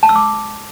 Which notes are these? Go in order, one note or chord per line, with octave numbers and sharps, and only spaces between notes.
A5
E6
D6